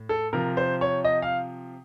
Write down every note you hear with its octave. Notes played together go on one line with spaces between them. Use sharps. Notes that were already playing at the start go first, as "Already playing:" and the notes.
Already playing: A2
A4
C3 F3 A#4
C5
C#5
D#5
F5